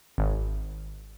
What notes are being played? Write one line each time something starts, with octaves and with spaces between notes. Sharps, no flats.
G#1